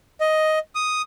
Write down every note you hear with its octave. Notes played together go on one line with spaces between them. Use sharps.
D#5
D#6